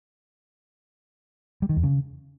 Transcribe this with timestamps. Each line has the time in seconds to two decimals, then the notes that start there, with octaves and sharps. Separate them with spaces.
1.62 G3
1.69 D#3
1.76 E2
1.83 C#3